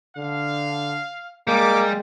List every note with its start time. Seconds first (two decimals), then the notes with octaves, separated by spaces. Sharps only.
0.17 D3 F5
1.48 G3 G#3 A#3 D6